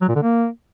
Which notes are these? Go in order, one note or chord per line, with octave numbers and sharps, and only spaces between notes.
F#3
A#2
D3
A#3